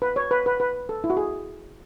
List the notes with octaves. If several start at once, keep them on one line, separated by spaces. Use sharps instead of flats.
B4
C#5
B4
B4
B4
A4
E4
F#4
G#4